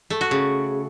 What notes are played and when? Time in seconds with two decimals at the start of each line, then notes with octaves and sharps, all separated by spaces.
0.10 A3
0.21 F#4
0.31 C#3